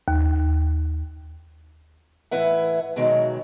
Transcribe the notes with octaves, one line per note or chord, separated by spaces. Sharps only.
D#2
A2 E3 E4 B4 E5 F#5
B2 D#3 F#3 G#3